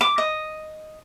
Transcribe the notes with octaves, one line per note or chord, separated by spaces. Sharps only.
D6
D#5